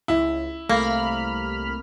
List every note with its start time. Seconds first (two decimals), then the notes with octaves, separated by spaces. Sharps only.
0.08 C#2 E4
0.69 C2 A3 A#3 B5 F6